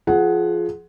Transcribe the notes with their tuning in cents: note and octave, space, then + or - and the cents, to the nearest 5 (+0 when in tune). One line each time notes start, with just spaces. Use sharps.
F3 +0 G#4 +20 F#5 +0